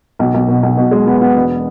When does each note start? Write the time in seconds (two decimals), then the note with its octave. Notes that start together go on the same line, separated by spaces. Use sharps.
0.19 B1
0.34 B1
0.48 B2
0.63 B1
0.77 B2
0.91 G#3
1.07 B3
1.21 B3
1.35 E1